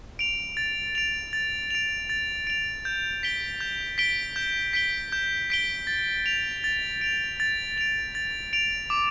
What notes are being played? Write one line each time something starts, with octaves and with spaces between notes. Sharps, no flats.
D7 F7
A6
D7 F7
A6
D7 F7
A6
D7 F7
G6
B6 D7 G7
G6
B6 D7 G7
G6
B6 D7 G7
G6
B6 D7 G7
A6
D7 F7
A6
D7 F7
A6
D7 F7
A6
D7 F7
D6